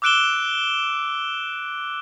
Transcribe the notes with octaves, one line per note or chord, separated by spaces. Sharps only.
D6 E6 F#6 D7 E7 G7